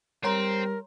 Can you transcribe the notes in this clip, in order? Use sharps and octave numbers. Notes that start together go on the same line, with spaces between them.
G3 C4 A#4 C#5 A#5 C6